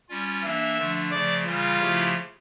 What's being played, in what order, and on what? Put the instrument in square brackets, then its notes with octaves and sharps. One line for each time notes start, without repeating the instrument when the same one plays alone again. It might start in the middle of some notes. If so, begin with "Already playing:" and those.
[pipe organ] G3 C#4 F4
[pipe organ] E3 A#3 D4 [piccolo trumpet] E5
[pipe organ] D3 F3 A3 D4
[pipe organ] C#3 F3 A3 [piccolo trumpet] D5
[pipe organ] C#3 E3 G3 [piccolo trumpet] F4
[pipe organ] C#3 F3 A3 E4 G4